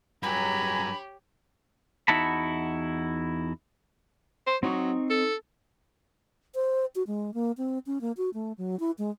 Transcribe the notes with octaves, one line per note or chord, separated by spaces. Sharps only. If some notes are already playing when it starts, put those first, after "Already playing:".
C#2 G2 F#3 G4 C#5 G#5 A#5 B5
E2 D#4 E4 F#4 A5 B5
C5
F#3 C4 D#4 C#6
A4
C5
F#4
G#3
A#3
C4
C#4
A#3
F#4
A3
F#3
E4
G#3